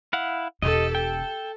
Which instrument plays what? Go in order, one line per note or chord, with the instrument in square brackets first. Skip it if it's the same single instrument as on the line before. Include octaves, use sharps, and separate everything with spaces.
[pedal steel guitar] E4 F5 F#5
[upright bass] E1 B2 [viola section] G4 A4 [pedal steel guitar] D#5
[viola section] A4 [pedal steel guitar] G5